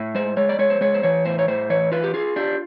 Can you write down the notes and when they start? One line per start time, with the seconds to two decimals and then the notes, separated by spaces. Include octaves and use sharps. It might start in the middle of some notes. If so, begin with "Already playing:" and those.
Already playing: A2
0.15 G#3 C5
0.37 G#3 C#5
0.49 D5
0.59 G#3 C#5
0.70 C5
0.81 G#3 C#5
0.94 C5
1.03 E3 C#5
1.26 A2 C5
1.39 C#5
1.48 A2 C5
1.70 E3 C#5
1.92 F4 B4
2.04 G4
2.14 F4 G#4
2.36 D4 G4